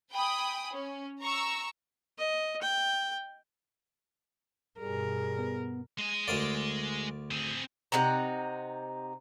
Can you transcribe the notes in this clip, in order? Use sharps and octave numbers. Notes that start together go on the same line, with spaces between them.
G5 G#5 B5 D#6
C#4
A#5 C#6 E6
D#5
G5
G2 B2 G3 G#4 A#4
B3
G#3 D#5
D2 A#4 D5
C4 G#4
C3 D#4 F#5 A#5